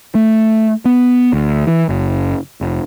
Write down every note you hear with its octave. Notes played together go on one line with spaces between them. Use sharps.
A3
B3
D2
E3
F#1
F1